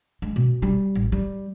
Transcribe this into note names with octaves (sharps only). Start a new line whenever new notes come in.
G#3
B2
G3
A1
G3